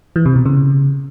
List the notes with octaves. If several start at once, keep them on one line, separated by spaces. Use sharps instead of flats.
E3
C3
B2
C#3